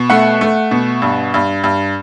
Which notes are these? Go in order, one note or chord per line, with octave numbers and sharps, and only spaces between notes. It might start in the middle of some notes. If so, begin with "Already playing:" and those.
Already playing: B2
A3 F#5
A3
B2
G2
G2
G2